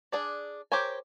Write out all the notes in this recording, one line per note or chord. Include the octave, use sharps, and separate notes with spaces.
D4 G#4 D5
G4 A#4 C5 C#5 G#5